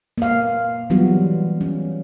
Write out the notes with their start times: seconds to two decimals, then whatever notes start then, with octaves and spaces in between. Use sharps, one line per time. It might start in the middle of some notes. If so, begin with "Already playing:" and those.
0.18 A#3 F5
0.90 E3 F#3 G3 B3 F4 F#4
1.61 C#4